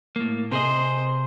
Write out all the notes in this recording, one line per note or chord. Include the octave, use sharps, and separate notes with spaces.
A2 A#3
C3 G#4 C5 D#5